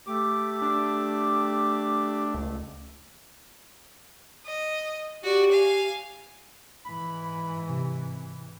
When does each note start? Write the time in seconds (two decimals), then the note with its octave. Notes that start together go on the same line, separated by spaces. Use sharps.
0.07 A3 G4 D6
0.62 D4
2.34 C#2
4.46 D#5
5.24 F#4 G4 D5
5.52 F5 G#5
6.85 G#2 E3 B5
7.69 C3